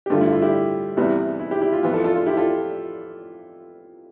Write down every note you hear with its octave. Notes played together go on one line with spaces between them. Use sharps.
G4
G2 D3 A3 F4
E4
F4
E4 G4
E2 C3 E3 G3 B3
E4
E4 G4
E4 G4
F4
F2 E3 B3 F4
F4 A4
F4 A4
F4
E4 G4
F4 A4